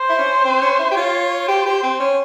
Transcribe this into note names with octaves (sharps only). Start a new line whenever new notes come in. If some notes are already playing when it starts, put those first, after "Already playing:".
Already playing: C5
E4
C#4
C4
C#4
E4
G4
F4 C#5
G4 C5
G4
C4
C#4